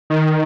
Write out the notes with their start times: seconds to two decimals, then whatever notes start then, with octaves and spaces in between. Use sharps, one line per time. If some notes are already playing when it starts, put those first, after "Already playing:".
0.10 D#3